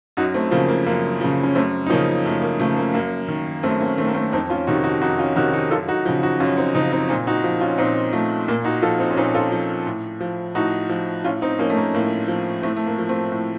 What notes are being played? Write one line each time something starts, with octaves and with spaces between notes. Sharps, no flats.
F#2 D#4 F#4
A3 C4
C#3 F3 A#3
A#3
F#2 A#3
C#3 F3
C#4
F#2 A3 C4
D#4
C#3 F3 A#3 C#4
F#2 A3
A#3
C#3 F3 A3
A#3
F#2 A#3
D#3
F#2 A3 C4
A#3 C#4
D#3 A3 C4
A#3
A3 C4
F2 C4 D#4
C#4 F4
C3 D#3 D#4 F#4
D#4 F#4
F2 D#4 F#4
C#4 F4
C3 D#3 D#4 F#4
D#4 F#4
F#2 F4 A4
D#4 F#4
C#3 F3
D#4 F#4
F#2 C#4 F4
C4 D#4
C#3 F3 C4 D#4
C4 D#4
A#2 C4 D#4
D#4 F#4
F3
C#4 F4
A#2 C4 D#4
F3 A3
A#2 A#3
D#4 F#4
F3 F4 A4
C4 D#4
C#4
A#2 C4 D#4
F4 A4
F3
A2
F3
A2 D#4 F#4
F3
A2 C#4 F4
C4 D#4
F3 A#3 C#4
A3
A#3
A2 A#3
F3
A2 A3 C4
A3
A#3
F3
A3 C4
A2